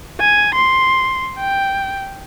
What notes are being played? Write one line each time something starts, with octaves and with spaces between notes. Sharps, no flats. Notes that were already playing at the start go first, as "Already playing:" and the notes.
G#5
C6
G5